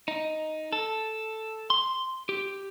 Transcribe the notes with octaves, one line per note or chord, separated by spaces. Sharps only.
D#4
A4
C6
G4